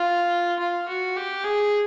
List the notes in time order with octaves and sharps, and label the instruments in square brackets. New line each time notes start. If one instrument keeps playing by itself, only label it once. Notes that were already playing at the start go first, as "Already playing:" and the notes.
Already playing: [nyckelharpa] F4
F4
F#4
G4
G#4